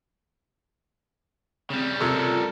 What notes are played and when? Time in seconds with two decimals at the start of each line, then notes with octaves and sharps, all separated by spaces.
1.70 C#3 G3 C4
2.01 C3 F4 A4 A#4